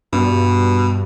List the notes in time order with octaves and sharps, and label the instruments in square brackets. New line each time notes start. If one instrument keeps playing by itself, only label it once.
[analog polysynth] G2 [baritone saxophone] B2